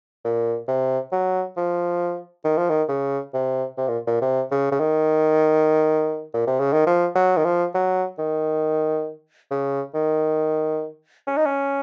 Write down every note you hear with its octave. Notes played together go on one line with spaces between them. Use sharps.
A#2
C3
F#3
F3
D#3
F3
D#3
C#3
C3
C3
A#2
A#2
C3
C#3
C#3
D#3
A#2
C3
C#3
D#3
F3
F#3
D#3
F3
F#3
D#3
C#3
D#3
C#4
D#4
C#4